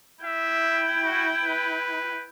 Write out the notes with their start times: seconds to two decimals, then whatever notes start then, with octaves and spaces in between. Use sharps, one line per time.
0.24 E4 E5 G5
1.04 F#4
1.43 B4